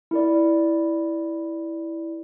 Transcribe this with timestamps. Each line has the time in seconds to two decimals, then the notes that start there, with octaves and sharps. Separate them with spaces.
0.11 E4 A#4 D5